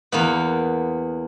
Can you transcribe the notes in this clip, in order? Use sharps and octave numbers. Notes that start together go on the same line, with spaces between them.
E2 A#3 B3